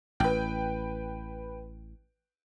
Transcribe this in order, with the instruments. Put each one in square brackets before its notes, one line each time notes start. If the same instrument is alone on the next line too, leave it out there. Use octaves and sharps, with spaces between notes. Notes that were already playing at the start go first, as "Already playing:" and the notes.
[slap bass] A1 [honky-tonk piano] B4 G5